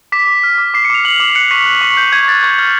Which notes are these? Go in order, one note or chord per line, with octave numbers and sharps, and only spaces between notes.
D6 B6
D6
F6
D6
D6 C7
C#7
D6 F7
F6 F#7
D6
F#6 C#7
C#6 B6
F#6
C#6
F#6 G6
C#6 G#6
F#6 A6
C#6 G#6
F6 G#6